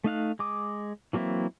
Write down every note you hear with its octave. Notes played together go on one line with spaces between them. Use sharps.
A3 D#4 F5 F#6
G#3 D6 D#6
E3 F#3 A#3 C4 E4